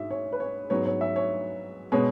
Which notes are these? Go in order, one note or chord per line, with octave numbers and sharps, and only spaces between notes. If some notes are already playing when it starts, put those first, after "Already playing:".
Already playing: G#2 F#4 E5
C#5
B4
C#5
G#2 F#3 B3 C#5
C#5
E5
C#5
B2 G#3 B3 C#5